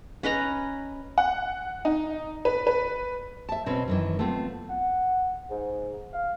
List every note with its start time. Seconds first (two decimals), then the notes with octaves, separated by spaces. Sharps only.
0.23 C#4 B4 D#5 A#5
1.18 F#5
1.85 D#4
2.45 B4
2.67 B4
3.49 E5 A5
3.66 B2 C4 C#4 B4
3.88 F#2 D#3 E3
4.19 A3 B3 C4 F4
4.70 F#5
5.50 G#2
6.14 F5